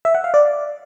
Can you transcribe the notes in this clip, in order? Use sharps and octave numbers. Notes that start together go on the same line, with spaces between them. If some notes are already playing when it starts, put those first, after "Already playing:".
E5
F#5
F5
D5